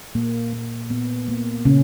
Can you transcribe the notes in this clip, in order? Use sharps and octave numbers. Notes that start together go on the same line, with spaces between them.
A#2 A#3
A#3
A#2 B3
A#3
A#2 C#3 C#4